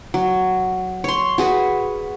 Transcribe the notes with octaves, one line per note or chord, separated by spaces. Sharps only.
F#3
C#5 C6
F#4 G#4 B4